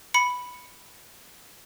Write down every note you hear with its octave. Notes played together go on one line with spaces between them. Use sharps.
B5 C#7